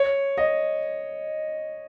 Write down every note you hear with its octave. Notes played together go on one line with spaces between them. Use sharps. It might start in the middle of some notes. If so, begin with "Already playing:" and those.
Already playing: C#5
D#5